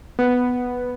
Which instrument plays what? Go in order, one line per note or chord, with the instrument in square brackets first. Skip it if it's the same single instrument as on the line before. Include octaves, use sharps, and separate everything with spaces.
[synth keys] B3